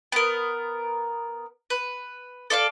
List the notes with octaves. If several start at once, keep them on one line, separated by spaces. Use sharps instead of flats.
B3 A#4
B4
A4 D5 E5 F5